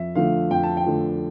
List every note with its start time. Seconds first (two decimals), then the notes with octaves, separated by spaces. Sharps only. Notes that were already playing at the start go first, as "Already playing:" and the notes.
Already playing: F2 E5
0.15 D3 F3 A3 F5
0.51 F2 G5
0.63 A5
0.77 G5
0.86 D3 F3 A3